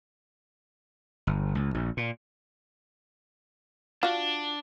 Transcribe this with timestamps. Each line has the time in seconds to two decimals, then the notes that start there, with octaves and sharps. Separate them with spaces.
1.27 G1
1.55 C#2
1.75 A#1
1.97 A#2
4.03 D4 F4 F#4